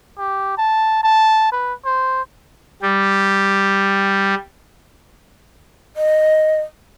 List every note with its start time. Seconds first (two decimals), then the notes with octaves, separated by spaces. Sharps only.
0.18 G4
0.58 A5
1.03 A5
1.52 B4
1.85 C5
2.82 G3 G4
5.96 D#5